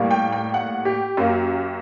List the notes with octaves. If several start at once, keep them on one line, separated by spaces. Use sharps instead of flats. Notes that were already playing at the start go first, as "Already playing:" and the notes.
Already playing: A2 G3 A#3
G5
G5
F#5
G4
F#2 F#3 A#3